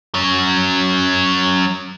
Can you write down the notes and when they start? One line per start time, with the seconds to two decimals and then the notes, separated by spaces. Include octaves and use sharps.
0.14 F#3 C#4